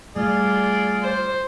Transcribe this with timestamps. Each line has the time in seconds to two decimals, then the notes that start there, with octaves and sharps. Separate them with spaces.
0.16 G3 A3 F4 G#4 D5
1.02 C5